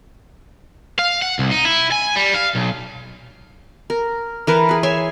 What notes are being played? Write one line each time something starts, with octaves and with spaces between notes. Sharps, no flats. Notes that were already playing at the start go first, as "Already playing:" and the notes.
F5
F#5
C2
D#4
E4
G#5
G3
F5
B1
A#4
E3 A#4 B4
G#4 B4
C#5 E5 G#5 C6